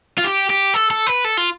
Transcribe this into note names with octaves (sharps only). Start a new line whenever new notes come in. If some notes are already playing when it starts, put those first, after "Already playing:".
F4
G4
G4
A4
A4
B4
A4
F4